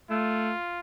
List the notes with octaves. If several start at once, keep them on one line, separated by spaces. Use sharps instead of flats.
A3 F4